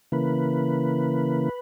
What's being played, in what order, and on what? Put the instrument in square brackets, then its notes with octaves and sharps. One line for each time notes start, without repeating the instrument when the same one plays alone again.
[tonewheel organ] C#3 E3 A#3 B4